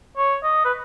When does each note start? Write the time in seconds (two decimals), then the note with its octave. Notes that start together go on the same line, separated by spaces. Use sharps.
0.17 C#5
0.43 D#5
0.64 B4